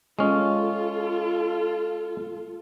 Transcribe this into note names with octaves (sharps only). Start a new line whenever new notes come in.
G#3 C#4 F4 A4